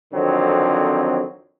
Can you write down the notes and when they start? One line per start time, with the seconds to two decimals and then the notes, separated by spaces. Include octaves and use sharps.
0.14 F2 D3 D#3 F#3 C4